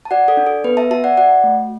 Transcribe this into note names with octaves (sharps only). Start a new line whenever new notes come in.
A5
F#4 D5 F#5
A4 D5
D4
A4
B3 B4
E5 A5
F#4 E5 A5
D5 F#5
F#4 D5 F#5
A3